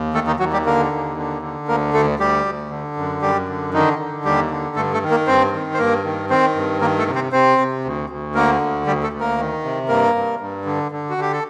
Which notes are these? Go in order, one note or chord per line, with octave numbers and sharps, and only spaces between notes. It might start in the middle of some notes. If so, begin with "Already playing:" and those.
Already playing: D#2
D#3 A3 A4
D#3 D#4
D#2 F#3 F#4
G3 G4
D3 A#3 A#4
D#2
D3
D3
D2 A#3 A#4
D2 A3 A4
D2 G3 G4
D2
D3
F#2
F#2 G3 G4
D3
D3 D#3 D#4
D3
D#2 G3 G4
D3
G2 A3 A4
A3 A4
D#3
A#3 A#4
G2 C4 C5
D#3
C5
G2 A#3 A#4
D#3
D#3 C4 C5
G2
D#3 A#3 A#4
A3 A4
C3
C4 C5
C3 C4 C5
C3
D2
D2
D3 A#3 A#4
D2
D2 G3 G4
A3 A4
D2
A#3 A#4
D#3
C3
G2 A#3 A#4
G2
G2
D3
D3
F#4
D3 G4
A4